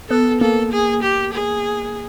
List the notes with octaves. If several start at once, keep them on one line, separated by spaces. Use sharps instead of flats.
B3 A4
A#3 A4
G#4
G4
G#4